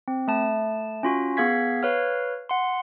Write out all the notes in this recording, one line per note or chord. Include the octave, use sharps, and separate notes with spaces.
C4
A3 A5
C#4 F4 F#4
B3 G#4 F5 G#6 B6
B4 C#5 F5 F6
F#5 C6